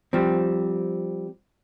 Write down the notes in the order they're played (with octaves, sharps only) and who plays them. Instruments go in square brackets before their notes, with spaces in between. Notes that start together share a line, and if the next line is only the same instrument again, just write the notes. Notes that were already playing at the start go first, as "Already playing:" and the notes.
[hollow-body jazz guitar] F3 G3 C4